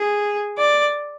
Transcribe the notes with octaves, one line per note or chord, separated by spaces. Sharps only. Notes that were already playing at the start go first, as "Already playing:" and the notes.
Already playing: G#4
D5